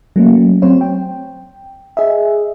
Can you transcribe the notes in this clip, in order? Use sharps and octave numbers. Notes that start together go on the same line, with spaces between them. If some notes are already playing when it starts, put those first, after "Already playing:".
F#3 A3 A#3 C#4
F#3 C4 C5 C#5
G5
G#4 D#5 E5